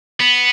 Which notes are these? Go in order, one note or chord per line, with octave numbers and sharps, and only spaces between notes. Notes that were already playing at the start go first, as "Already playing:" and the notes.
B3